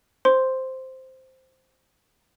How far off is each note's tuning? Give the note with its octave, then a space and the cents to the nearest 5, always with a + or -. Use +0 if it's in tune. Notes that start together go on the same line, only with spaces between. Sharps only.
C5 +0 C6 +0